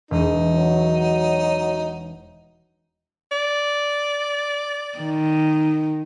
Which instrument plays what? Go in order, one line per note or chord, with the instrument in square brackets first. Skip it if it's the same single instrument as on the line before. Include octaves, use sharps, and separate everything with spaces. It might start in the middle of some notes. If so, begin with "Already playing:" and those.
[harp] E1 [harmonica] D#4
[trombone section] F#3
[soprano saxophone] D5
[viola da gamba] D#3